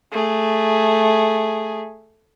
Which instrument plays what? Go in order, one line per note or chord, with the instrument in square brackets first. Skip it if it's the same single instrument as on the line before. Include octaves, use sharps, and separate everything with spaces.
[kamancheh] A3 G#4